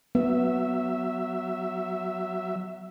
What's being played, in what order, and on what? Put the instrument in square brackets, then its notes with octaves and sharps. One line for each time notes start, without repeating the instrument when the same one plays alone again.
[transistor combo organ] F#3 E5 [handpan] B3